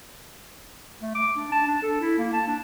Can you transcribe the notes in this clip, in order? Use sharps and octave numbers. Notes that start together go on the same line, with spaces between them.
A3
D6
D4
A5
D4
A4
E4
A#3
A5
D4